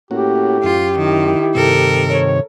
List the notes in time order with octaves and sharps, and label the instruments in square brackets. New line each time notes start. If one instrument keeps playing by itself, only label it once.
[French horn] A2 [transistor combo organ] A#3 C#4 F#4 [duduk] G4
[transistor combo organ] F#2 C#4 [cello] F4
[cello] D#3 [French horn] E4
[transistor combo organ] G2 C3 D#3 [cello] A4 A#4
[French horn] C#5